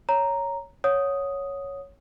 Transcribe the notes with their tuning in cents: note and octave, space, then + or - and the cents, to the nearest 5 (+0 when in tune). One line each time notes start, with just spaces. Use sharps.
C#5 +0 A#5 +0
C#5 +0 F#5 -20 D#6 +0